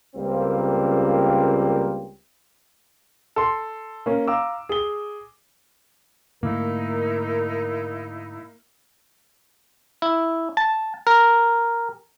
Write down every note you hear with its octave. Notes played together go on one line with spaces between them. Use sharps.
C#2 G3 A#3 C4
A4 C6
A#3 C#4
F5 A#5 D6 E6
G#4 G7
G#2 D3 A3 A#3 D#4 E4 A#4
E4
A5
A#4